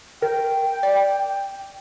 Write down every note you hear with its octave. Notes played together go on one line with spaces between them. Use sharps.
A#4 G5
D5